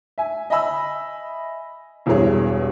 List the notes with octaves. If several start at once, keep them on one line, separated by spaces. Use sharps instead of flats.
E5 G#5
D#5 E5 G#5 B5 E6
E1 E2 G2 E4 G#4 C#5